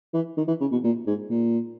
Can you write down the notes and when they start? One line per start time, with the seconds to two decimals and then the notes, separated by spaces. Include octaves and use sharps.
0.14 E3
0.37 D#3
0.48 E3
0.61 C#3
0.72 B2
0.84 A#2
1.07 G#2
1.30 A#2